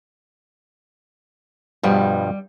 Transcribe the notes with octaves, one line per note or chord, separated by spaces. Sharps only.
G2 B2 F3 G3